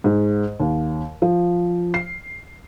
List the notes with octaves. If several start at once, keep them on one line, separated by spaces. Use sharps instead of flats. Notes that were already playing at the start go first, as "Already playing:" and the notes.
G#2
D#2
F3
C7